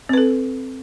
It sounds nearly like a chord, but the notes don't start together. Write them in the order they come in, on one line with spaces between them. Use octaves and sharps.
C4 B4 A4